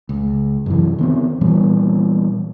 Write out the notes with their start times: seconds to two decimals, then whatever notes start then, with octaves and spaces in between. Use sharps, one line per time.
0.09 C#2
0.66 F#2 C3 E3
0.98 D#3 B3 C4
1.41 A#2 E3 G3 B3